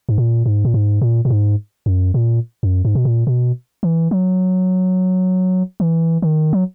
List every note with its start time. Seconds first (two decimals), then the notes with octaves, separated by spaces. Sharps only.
0.09 G#2
0.18 A#2
0.46 G#2
0.65 A#2
0.74 G#2
1.01 A#2
1.25 A#2
1.30 G#2
1.86 F#2
2.14 A#2
2.63 F#2
2.85 G#2
2.95 B2
3.05 A#2
3.27 B2
3.83 E3
4.11 F#3
5.80 E3
6.22 D#3
6.53 F#3